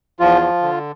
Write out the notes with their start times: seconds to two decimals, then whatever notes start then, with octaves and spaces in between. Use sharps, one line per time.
0.20 E2 F3 F4
0.41 F3
0.62 D3